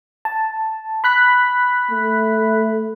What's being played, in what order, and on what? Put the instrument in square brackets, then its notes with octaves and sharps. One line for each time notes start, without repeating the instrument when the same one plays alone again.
[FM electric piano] A5
B5 F#6 B6
[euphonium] A3